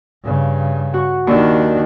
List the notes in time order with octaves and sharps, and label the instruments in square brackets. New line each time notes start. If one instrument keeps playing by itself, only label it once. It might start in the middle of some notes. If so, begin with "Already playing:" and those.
[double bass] G2 C#3
[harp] F#4 C#6
[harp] D#2 C#6 [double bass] D#3 D4